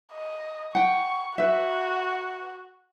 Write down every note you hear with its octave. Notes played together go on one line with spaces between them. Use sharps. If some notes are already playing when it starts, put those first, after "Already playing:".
D#5
F#5 G5 C#6
F#4 B4 E5